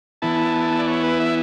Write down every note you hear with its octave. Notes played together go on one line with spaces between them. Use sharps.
E3 B3 E4 A5
D5
C#5
B4
E5